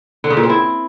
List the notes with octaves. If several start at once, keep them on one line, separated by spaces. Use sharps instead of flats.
D3
C#3
A#2
C4
E4